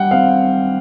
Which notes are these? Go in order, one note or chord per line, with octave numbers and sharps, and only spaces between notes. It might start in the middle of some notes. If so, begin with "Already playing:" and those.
Already playing: G3 F#5 G5
C4 F5